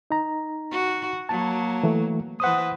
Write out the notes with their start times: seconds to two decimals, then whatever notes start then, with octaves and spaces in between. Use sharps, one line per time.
0.11 D#4 A#5
0.71 F#4
1.29 F#3 A#3 A5
1.83 E3 A3
2.40 E3 B4 C5 F#5 D#6